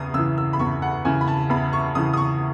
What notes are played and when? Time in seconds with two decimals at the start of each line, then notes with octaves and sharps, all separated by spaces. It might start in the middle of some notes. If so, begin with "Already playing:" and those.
Already playing: E2 C#3 D#6
0.14 C#3 E3 E6
0.38 E6
0.53 B5
0.59 E2 C#6
0.82 F#5
1.05 C#3 E3 G#5
1.21 B5
1.28 A5
1.50 E2 B5
1.73 C#6
1.95 C#3 E3 D#6
2.13 D#6
2.17 C#6